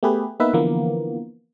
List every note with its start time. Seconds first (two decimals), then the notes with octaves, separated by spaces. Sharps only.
0.03 A3 B3 G4 G#4 B4
0.40 A#3 B3 D#4 B4 E5
0.53 D3 E3 F3 A#3 B3